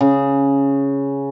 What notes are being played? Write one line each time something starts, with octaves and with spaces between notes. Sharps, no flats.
C#3